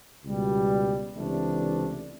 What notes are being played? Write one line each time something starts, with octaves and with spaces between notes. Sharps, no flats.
C#2 B2 G3
C#2 C3 E3 A3 D4